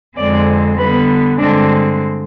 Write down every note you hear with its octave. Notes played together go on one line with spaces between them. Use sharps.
F2 D3 G#3 C4 D5
D3 G3 B3 B4
G2 D3 G#3 C4 D4